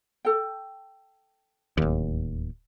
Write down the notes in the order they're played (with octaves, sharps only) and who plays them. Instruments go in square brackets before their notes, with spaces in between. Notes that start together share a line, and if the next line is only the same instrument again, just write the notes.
[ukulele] A4 G5
[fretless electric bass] D1 D#2